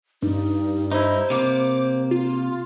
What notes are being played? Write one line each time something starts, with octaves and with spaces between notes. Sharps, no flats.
G2 D#4
D#4 E4 C5
C3 A#3 D6
F4